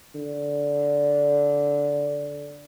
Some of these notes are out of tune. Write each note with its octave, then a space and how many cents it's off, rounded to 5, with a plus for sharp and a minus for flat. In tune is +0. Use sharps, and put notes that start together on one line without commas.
D3 -15